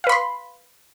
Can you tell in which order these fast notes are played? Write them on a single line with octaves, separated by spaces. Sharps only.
F5 B4 B5 C6